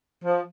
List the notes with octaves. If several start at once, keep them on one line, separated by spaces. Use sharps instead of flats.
F3